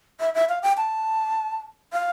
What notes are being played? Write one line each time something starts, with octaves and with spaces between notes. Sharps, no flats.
E5
E5
F5
G5
A5
F5